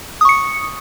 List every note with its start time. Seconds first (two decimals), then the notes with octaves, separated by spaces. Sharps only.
0.21 D#6
0.25 C#6
0.29 C#7